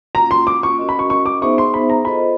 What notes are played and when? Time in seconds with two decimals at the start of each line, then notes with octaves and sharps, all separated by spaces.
0.15 A#3 C#4 F4 A#5
0.31 C6
0.47 D6
0.63 C#6
0.79 C#4 F#4 A#4 D#5
0.89 B5
0.99 C#6
1.10 C#6
1.26 D6
1.42 B3 D#4 G#4 C5 E5 C#6
1.58 C6
1.74 B5
1.90 A#5
2.05 F4 A4 C5 D#5 B5